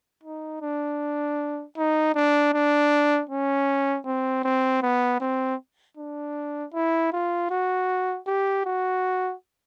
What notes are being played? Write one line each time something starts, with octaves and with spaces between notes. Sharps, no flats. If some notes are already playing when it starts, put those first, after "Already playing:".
D#4
D4
D#4
D4
D4
C#4
C4
C4
B3
C4
D4
E4
F4
F#4
G4
F#4